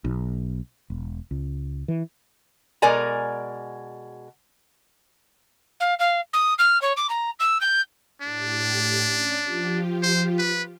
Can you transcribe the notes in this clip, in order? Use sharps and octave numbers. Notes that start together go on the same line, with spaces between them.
B1
E1
C#2
E3
B2 G#3 A#4 D5 G#5 A#5
F5
F5
D#6
F6
C#5
D6
A#5
E6
G6
A2 D4 G4
C#4 D5
F3 F4 G4
C5
B4